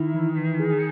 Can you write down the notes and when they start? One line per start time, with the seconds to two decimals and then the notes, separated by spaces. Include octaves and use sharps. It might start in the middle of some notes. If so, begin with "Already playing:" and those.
Already playing: D#3 E4
0.14 E3
0.36 E3
0.59 G#4